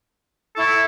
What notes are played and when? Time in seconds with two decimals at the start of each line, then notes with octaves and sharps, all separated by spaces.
0.56 E4 A4 C#6